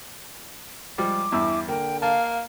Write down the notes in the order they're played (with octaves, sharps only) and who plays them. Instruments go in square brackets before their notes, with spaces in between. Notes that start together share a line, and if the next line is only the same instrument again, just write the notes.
[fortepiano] F3 G3 G#3 [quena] D6
[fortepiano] E2 G2 E6 [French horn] E4
[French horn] D3 [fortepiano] A#3 [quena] G5
[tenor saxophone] A#3 [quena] F5 [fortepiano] A5